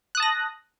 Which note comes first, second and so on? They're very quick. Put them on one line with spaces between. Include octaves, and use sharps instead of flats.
F#6 D#6 A5 A#6